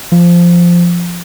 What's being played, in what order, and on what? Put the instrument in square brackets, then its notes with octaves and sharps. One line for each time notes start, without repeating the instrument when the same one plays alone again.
[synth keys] F3